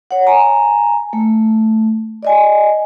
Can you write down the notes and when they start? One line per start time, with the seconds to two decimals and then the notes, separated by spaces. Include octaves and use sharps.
0.11 C#5 F#5
0.27 G#5 A#5
1.13 A3
2.23 D5 D#5 G#5